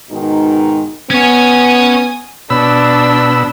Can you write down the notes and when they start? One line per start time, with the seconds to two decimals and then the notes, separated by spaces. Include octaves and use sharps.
0.11 G#2 B2 D#3 D#4
1.10 B3 C#4 C#5 G#5 D#6
2.50 B2 D4 B5 E6